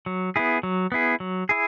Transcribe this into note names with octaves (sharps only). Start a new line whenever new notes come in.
F#3
B3 E4 G#4
F#3
B3 E4 G#4
F#3
E4 G#4